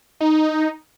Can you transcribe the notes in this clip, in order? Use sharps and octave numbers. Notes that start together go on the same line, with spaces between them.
D#4